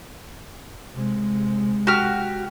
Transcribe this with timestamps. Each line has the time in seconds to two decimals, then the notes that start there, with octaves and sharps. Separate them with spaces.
0.94 C3 G#3
1.87 F#4 G4 F6